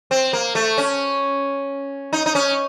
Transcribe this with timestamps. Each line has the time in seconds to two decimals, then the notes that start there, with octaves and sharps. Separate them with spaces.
0.11 C4
0.33 A#3
0.55 A3
0.78 C#4
2.13 D#4
2.26 D#4
2.35 C#4